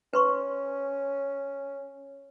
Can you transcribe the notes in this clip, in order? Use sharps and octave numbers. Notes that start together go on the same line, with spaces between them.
C#4 B4 C6 C#6